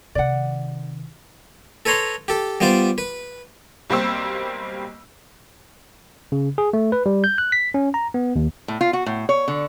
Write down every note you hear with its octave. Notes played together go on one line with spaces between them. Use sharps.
C3 D#3 D5 F#5
A4 B4 C#5 A#5 C6
G4 A4
G3 B3 F4 C5 D5
B4
B1 G3 A#3 C4 C5 E6
C#3
G#4
A3
B4
G3
G6
F#6
B6
C#4
A#5
B3
D#2
A2
F4
F#4
A2
C#5
D3